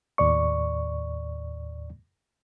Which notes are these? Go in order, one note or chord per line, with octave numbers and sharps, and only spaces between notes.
D#2 A2 D5 C#6